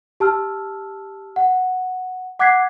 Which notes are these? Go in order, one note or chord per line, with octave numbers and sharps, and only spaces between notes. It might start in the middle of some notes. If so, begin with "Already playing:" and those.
G4 A5 E6 F6
F#5
F#5 D6 F#6 G#6 B6 C7